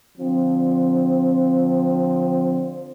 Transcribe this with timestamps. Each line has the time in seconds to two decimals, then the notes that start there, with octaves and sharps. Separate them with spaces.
0.18 D3 F3 C4